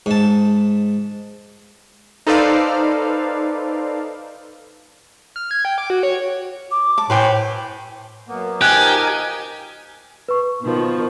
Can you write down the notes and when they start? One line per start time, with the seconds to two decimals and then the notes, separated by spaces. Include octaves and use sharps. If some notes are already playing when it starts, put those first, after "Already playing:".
0.06 G#2 A5
2.27 D#4 A4 B4 C5 D5 F5
5.36 F6
5.51 G#6
5.65 G5
5.78 D6
5.90 F#4
6.03 C#5
6.71 D6
6.98 A5 D6
7.10 A2 B4 C5 G5 G#5
8.28 F#2 A#3 B3
8.61 F3 D#4 G4 A#4 G#5 F#6
10.28 B4 C#6
10.61 B2 D#3 F3